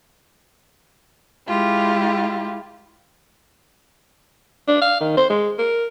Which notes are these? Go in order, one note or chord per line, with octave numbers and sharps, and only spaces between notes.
G#3 E4 F4 G4
D4
F5
D#3
C5
G#3
A#4